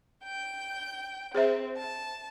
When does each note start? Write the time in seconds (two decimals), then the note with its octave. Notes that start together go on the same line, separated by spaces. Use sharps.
0.24 G5 G6
1.35 C4 G#4 C5 E5
1.77 A5